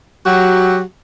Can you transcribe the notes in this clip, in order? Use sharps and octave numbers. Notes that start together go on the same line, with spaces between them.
F#3 F#4 G4